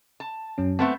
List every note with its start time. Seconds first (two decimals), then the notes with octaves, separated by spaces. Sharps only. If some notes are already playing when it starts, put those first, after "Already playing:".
0.20 A5
0.58 F#2 F#3 C#4
0.79 A3 B3 C4 A5